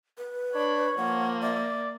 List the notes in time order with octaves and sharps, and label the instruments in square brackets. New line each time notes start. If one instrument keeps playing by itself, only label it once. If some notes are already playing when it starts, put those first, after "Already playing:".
[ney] B4
[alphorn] D4 [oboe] C#5 [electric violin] B5
[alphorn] F3 [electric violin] A#3 [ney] F#5
[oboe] D5 [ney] E5